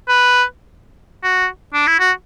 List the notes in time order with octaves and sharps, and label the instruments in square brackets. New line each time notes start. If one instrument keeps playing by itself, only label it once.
[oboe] B4
F#4
D4
E4
F#4